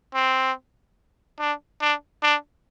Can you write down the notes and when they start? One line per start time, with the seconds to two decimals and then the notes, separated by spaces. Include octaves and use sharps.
0.14 C4
1.40 D4
1.81 D4
2.22 D4